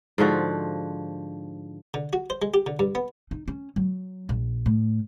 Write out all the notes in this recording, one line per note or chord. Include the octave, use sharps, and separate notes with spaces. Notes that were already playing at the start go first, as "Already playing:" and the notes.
G#2 D3 F3 F#4
D3
F#4
C5
G#3
G4
D3
G2
B3
D#4
C#4
F#3
A#1
A2